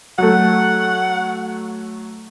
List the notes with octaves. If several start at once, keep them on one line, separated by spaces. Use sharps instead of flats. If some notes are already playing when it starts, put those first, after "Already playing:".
F#3 A3 F#5